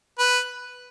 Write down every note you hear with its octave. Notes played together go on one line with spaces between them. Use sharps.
B4